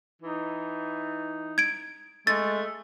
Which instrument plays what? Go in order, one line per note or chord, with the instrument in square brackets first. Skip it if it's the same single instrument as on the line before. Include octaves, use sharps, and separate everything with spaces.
[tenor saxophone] E3 [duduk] D#4
[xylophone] G#6 D7
[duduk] G#3 [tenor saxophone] A3 [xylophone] A6